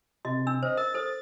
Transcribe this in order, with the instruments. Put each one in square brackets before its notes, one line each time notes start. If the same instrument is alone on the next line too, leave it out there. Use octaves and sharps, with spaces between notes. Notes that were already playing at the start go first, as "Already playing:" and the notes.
[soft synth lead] C3 [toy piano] F#4 D#5
[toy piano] D4 E6
[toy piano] C5 [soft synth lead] D#5
[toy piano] A#4 [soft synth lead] A6
[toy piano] A4 C5